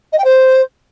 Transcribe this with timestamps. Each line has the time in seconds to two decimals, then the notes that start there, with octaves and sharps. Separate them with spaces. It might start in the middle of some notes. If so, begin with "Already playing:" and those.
0.13 D#5
0.18 G5
0.24 C5